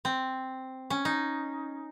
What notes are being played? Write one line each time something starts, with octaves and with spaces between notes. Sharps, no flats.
C4
C#4
D#4